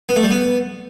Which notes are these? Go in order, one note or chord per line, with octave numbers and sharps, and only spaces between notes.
B3
A3
G3
B3